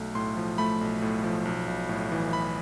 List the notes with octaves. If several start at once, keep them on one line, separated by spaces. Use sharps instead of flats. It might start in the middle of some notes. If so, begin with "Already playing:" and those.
Already playing: B1 A3
A2 C6
F3
A3 B5
B1
A2
F3
B1
B1
A2
E3
B1 B5